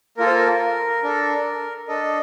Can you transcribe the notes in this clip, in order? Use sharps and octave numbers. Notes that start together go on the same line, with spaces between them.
A#3 F4 A4 A#4
C5
A#4
D4 A4
D4 A4 D#5